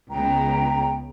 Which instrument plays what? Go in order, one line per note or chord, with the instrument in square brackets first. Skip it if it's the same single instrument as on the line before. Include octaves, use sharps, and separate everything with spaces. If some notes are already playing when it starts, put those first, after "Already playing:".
[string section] C#2 B3 [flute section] G5 A#5